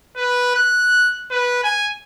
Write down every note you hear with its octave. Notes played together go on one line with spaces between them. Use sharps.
B4
F#6
B4
G#5